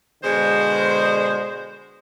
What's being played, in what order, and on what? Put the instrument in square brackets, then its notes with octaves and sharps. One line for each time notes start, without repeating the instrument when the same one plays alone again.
[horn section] B2 D3 G#3 [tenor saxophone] C5